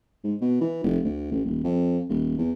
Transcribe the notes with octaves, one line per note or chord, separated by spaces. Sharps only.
G#2
B2
E3
F1
D2
A1
D#1
F2
D#1
E2